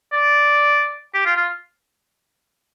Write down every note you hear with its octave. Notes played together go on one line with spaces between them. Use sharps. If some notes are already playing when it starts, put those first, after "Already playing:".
D5
G4
F4
F4